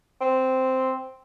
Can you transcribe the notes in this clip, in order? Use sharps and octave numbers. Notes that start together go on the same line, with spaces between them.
C4